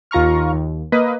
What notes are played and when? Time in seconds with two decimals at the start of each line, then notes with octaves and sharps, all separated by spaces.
0.11 D#2 F4 A#5 C#6 F6
0.53 D#2
0.92 A#3 B4 D#5